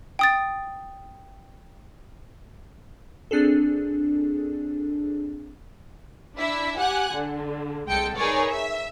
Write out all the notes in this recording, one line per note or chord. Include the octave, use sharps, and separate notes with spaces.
G5 D#6 A6
C4 D4 G#4 A4
D4 E4 E5
G4 F#5 G#5 F#6
D3
C2 G#3 A4 G5 C#7
D#4 G#4 A#4 B4 C#5 D5
E5